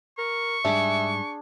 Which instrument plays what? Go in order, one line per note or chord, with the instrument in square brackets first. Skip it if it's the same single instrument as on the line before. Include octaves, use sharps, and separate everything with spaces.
[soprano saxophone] A#4 [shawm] C#6
[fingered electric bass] G#2 G3 [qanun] D4 G#4 D6 [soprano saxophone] E5